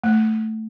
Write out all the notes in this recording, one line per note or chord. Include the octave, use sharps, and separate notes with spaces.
A3